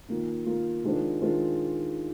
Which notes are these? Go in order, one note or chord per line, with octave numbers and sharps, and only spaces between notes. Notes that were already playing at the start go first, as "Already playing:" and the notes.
D#3 A#3 F4
D#3 A#3 F4
D#3 G#3 D4 F4 C5
D#3 G#3 D4 F4 C5